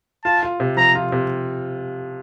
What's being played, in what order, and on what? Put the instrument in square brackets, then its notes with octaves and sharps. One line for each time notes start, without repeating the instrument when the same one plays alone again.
[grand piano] F4 [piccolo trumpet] A5
[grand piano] F4
C3
[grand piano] F3 [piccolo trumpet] A#5
[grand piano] F4
C3